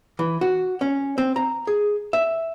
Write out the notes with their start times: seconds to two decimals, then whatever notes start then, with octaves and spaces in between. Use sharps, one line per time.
0.19 E3
0.41 F#4
0.81 C#4
1.18 C4
1.36 A#5
1.67 G#4
2.13 E5